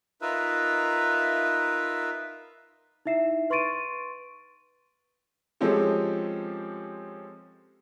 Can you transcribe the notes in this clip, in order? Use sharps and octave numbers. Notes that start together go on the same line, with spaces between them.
D#4 F4 A#4 B4 E5
D#4 E4 E5 C7 E7
B4 C6 C#6 A6 D7 D#7
F3 G#3 C4 C#4 G4 A4